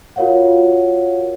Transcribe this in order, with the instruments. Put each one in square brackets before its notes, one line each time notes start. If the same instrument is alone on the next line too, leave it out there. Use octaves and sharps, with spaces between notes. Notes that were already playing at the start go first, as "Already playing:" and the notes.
[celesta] F4 F#4 A#4 C#5 F5 F#5